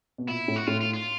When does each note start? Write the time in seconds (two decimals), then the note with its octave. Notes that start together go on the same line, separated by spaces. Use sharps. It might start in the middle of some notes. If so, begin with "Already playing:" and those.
0.18 B2
0.28 A#2 E4
0.48 A2
0.56 F#4
0.67 A2 F4
0.81 F4
0.94 F4